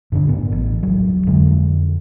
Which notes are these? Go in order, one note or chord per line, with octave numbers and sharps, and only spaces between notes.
G2 D3 D4
A2 B3
A1
E1 F#3
F2 D3 G#3